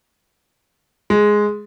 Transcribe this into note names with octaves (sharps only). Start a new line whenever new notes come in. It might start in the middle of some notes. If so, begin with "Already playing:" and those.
G#3